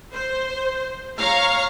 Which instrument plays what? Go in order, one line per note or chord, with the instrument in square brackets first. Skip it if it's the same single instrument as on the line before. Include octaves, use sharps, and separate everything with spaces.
[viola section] C5
C#5 F5 A#5